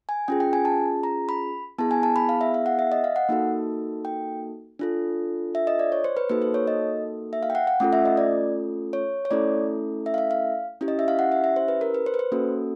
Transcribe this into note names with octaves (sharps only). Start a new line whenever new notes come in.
G#5
C#4 F4 G#4 G5
G5
G#5
A5
A#5
B5
B3 E4 G#4 A5
G#5
A5
B5
F5
E5
F5
F#5
E5
D#5
F5
F#5
A#3 D#4 F#4 A4
G5
D4 F4 A4
E5
D#5
D5
C#5
C5
B4
A#3 D#4 F#4 A4 B4
C5
C#5
D#5
E5
F5
G5
F#5
F#5
A3 C#4 F4 A4 F#5
E5
D#5
D5
C#5
C#5
A3 C#4 E4 A4 D5
E5
F5
E5
F5
C#4 E4 G4
D#5
E5
F5
F#5
E5
E5
C5
B4
A#4
B4
C5
B4
C5
A#3 C#4 F#4 A4